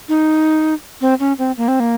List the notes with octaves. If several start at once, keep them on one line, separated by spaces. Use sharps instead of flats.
D#4
C4
C#4
C4
A#3
C4
A#3